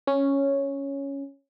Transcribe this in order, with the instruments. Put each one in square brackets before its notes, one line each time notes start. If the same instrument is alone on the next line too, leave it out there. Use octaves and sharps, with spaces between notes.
[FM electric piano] C#4